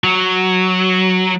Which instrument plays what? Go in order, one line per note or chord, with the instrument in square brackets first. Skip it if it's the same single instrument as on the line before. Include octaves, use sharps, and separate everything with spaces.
[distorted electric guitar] F#3